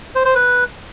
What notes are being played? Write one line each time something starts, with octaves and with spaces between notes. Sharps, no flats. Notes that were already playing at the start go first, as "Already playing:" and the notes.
C5
C5
B4